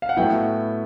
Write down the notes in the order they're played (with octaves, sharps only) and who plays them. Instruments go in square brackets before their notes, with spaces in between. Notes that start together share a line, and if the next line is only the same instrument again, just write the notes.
[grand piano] F5
F#5
A2 F#3 B3 E4 G5